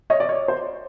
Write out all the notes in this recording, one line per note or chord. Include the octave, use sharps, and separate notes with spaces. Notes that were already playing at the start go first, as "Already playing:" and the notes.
C#5 D#5
D5
C#5
C5